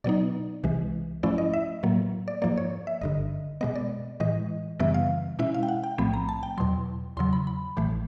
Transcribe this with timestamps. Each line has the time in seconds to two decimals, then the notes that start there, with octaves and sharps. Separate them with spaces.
0.04 B2 F#3 B3 D#4 D5
0.64 C2 C3 E3 G#3
1.23 G#2 F3 A3 C#4 E4 D5
1.38 D#5
1.54 E5
1.83 A2 F#3 A#3
2.28 D5
2.42 G#2 F3 A#3 D5
2.58 C#5
2.87 E5
3.01 G1 G2 D3 D#5
3.61 B2 G#3 B3 D#5
3.76 D5
4.20 A2 E3 G#3 D#5
4.80 F#2 C#3 E3 G3 B3 E5
4.94 F5
5.39 B2 G#3 C#4 E4 E5
5.54 F5
5.63 G5
5.69 F#5
5.84 G5
5.98 B1 A2 F3 A3 C4 B5
6.14 A#5
6.29 A5
6.43 G5
6.58 E2 B2 F#3 C6
7.17 E2 C#3 F#3 C6
7.33 B5
7.47 B5
7.77 A1 A2 E3 A3